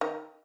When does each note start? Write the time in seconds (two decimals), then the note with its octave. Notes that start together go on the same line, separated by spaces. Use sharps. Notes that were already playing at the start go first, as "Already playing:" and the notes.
0.01 D#3